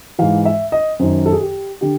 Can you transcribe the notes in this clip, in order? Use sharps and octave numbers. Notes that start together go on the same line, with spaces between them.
G#2 E3 F5
E5
D#5
F#2 D#3 C5
A4
G#4
G4
D3 G4